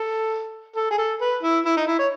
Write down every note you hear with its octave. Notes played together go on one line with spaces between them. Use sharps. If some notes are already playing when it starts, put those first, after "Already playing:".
Already playing: A4
A4
G#4
A4
B4
E4
E4
D#4
E4
C#5